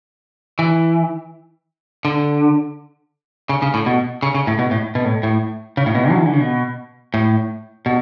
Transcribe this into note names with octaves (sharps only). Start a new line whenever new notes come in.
E3
D3
C#3
C#3
A2
B2
C#3
C#3
A2
B2
A2
B2
A2
A2
C#3
A2
B2
F#3
E3
D3
C#3
B2
A2
B2